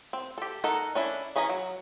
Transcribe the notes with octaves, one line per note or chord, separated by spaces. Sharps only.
C4
G4 A4
D#4 A4 A#4 F#5
C#4 D4 E4
E3 C#4 D#5 A#5
F#3